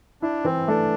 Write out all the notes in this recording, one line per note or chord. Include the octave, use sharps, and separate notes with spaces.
D4 E4
E3 C4
A3 D4